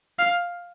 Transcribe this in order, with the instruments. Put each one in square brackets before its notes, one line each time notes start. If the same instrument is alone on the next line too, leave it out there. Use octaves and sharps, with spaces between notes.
[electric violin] F5